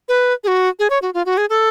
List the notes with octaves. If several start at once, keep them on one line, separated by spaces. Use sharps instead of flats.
B4
G#4
F#4
G#4
C#5
F#4
F4
F#4
G#4
A4